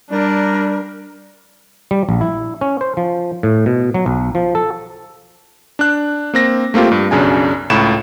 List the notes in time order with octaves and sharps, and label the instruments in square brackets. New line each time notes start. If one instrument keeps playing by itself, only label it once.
[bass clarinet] G3 [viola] D4 [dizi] A#4
[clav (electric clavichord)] G3
A#1
E4
C#4
C5
F3
A2
B2
F#3
B1
F3
A4
[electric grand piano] D4 F#6
A#3 C4 A#6
A3 A#3 C4 F4 G4
G2
B1 F#2 C#3 D4 G#5
C#2 A2 B5 E7